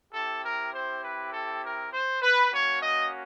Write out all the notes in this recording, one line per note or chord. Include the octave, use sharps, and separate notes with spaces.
C4 E4 G4 A4
A#4
C5
B4
A4
A#4
C5
B4
A#3 C#4 F#4 C#5
D#5